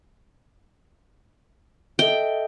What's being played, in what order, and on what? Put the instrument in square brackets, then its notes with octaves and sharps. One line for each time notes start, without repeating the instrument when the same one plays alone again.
[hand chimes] A4 D#5 E5 [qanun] G5